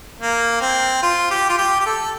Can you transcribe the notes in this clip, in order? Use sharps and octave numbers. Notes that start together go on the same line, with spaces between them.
A#3
C4
F4
G4
F4
G4
G4
A4